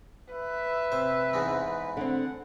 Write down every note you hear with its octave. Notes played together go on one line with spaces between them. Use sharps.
B4 E5
C3 C5
E2 G#2 G#3
D3 C4 F#5